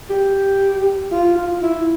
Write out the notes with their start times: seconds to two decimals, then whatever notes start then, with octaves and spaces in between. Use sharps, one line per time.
0.10 G4
1.12 F4
1.36 F4
1.62 E4